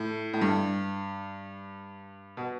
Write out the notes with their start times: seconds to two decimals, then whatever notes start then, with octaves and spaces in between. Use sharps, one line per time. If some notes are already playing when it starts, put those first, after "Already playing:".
Already playing: A2
0.34 A2
0.42 G2
2.37 B2